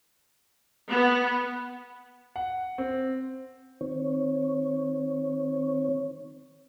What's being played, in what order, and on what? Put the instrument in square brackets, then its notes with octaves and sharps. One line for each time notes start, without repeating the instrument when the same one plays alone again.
[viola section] B3
[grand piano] F#5
C4
[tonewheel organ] D#3 C4 C#5